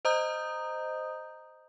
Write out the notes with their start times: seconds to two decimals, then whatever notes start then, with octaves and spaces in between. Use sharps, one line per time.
0.05 C5 D#5 A#5 D#6 G6